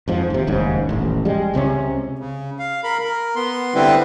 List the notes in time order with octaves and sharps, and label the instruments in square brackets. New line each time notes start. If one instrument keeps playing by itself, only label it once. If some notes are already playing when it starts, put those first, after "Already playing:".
[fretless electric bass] F2 G#2 F3
D#2 C3
F1 D#2 G#2 C#3
D#1 A1
G3 G#3
C#2 C3 C4 C#4
[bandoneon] C#3
F5
A#4 B5
A#4
B3 C6
D3 G3 B3 C4 E4 B4